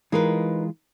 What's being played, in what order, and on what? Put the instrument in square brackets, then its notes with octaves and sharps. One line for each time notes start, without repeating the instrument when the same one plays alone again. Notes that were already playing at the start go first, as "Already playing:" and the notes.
[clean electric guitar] E3 G#3 F4 [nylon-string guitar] D#4 A#4 B4